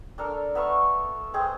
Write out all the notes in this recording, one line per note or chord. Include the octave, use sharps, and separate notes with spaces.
D4 A4 A#4
B3 E5 F5 C#6
G#3 C4 G#4